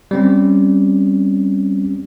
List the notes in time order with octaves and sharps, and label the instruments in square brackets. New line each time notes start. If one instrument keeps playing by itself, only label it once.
[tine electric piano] G3 C4 C#4